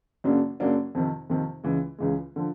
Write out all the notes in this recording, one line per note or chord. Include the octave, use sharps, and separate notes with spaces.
F#2 C#3 F#3 A#3 D4
F#2 C#3 F#3 A#3 D4
F2 C3 D#3
F2 C3 D#3
C#2 C#3 E3 G#3
C#2 C#3 E3 G#3
D3 F3